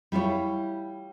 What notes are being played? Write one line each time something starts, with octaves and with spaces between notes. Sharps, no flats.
G3 E4 F4 C#5